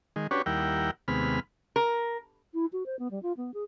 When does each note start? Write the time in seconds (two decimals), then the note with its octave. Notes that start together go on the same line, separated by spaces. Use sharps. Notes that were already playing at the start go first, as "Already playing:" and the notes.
0.16 D#3 G#3
0.31 C#4 D4 F#4 G4 B4 C#5
0.46 D#2 G3 E4 A#4 F#5 G5
1.08 D#2 C3 G#3 B3 B5 F6
1.76 A#4
2.54 E4
2.73 F#4
2.86 C5
2.99 B3
3.11 G3
3.23 F4
3.37 B3
3.54 G#4